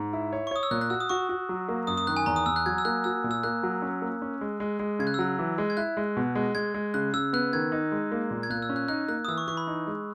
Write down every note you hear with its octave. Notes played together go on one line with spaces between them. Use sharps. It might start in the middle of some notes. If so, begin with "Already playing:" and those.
Already playing: G#2
E4
C#5
C#6
C#5 D#6
E6
A#2 F#6
F#6
F#4 E6
D#6
F#4 C#6
F#4
F#3
A#3
F#2 D#6
D#6
D#3 F#6
G#5
E2 A#5
D#6
E2 E6
F#6
F#3 G#6
E6
A#3 F#6
F#4 E6
A#2
E6
A#3 F#6
F#3
C#4
A#3
C#4
G#3
G#3
G#3
C#3 G#6
F#6
E6
F#3 F#6
E3
G#3
G#6
E4 F#6
G#3
B2
G#3
G#3 G#6
G#3
C#3 F#6
C#3 E6
B3 F#6
D#3 G#6
D#4
G#3
A#3
A#2
G#6
A#2 F#6
E6
C#4
F#6
D#4 F#6
A#3 F#6
D#6
E3 E6
C#6
E3 C#6
B5
D#4
G#3